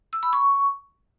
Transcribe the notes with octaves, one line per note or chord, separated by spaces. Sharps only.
E6
B5
C#6